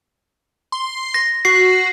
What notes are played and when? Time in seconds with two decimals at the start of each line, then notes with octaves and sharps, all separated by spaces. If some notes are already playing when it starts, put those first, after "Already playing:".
0.72 C6
1.14 A#6
1.45 F#4 C7